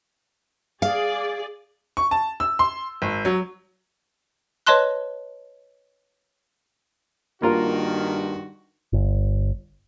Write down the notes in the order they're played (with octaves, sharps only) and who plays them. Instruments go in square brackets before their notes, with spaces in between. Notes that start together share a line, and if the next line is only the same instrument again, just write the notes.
[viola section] G#4 D5 [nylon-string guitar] F5
[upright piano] C#6
A5
E6
C6
G#1
F#3
[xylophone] B4 C#5 D#5 A5 C6 F#6
[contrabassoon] G2 [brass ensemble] D#3 F#4 [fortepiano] A#3 F4 A#4
[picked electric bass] G1